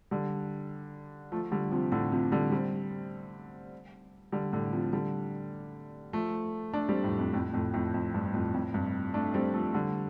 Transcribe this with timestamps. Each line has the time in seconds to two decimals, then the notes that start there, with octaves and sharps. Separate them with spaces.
0.11 D3 G3
1.32 F3 A3
1.52 D3 G3
1.71 C3 F3
1.92 A2 D3
2.12 C3 F3
2.32 D3 G3
2.52 G3 C4
4.32 D3 G3
4.53 A2 D3
4.73 C3 F3
4.93 D3 G3
6.13 F3 A3
6.73 A3 D4
6.89 G3 C4
7.03 F2 A2
7.18 F2
7.33 F2 A2
7.53 F2 A2
7.74 F2 A2
7.94 F2
8.14 G2
8.34 F2 A2
8.54 F2 A2
8.74 G2 C3
9.14 A3 D4
9.34 G3 C4
9.54 F3 A3
9.74 D3 G3